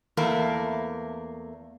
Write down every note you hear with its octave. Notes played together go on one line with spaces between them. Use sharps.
E2 A3 A#3